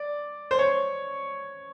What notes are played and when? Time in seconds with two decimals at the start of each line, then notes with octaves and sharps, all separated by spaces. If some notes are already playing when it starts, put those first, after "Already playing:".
Already playing: D5
0.51 C5
0.59 C#5